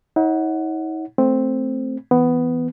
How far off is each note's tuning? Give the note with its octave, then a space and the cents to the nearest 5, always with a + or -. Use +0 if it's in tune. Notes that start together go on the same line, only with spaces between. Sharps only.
D#4 +45 C#5 +0 F#5 +0
A3 +0 C4 +0
E3 +0 B3 +10